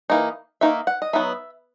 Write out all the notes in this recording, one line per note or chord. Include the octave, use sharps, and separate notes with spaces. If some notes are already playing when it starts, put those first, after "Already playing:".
E3 A#3 D#4
D#3 A#3 D#4 E5
F#5
D#5
F#3 B3 D#4 E5